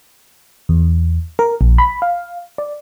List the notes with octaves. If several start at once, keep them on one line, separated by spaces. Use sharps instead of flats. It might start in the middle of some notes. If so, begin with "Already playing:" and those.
E2
A#4
A#1
B5
F5
D5